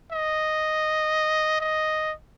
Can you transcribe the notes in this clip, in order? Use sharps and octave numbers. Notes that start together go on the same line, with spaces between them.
D#5
D#5